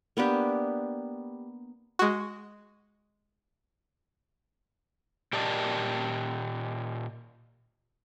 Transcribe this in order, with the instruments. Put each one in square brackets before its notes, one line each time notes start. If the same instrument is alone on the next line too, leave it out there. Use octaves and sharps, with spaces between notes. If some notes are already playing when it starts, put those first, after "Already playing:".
[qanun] A#3 B3 D4 G4
[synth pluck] G#3 F#4
[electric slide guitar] A#2 G4 A#4 D5 D#5 A5